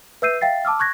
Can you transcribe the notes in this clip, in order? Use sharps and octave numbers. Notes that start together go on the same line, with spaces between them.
B4 E5 E6 G6 C7 D#7
E5 F5 G5 A6 C7
A5 D6 E6 F6
C#6 F#6 G#6 A#6